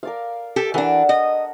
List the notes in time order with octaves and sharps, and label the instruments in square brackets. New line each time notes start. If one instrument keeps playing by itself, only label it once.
[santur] A#4 D5 F5
[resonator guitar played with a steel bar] G4 A4
[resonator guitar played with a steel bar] E3 D4 [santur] A#4 F#5 A5
[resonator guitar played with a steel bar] D#5